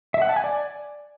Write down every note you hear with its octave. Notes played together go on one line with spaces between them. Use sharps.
E5
F#5
A5
G#5
D5